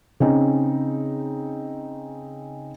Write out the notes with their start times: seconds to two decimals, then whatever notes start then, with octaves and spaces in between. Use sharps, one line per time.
0.20 C#3 C4 C#4 D#4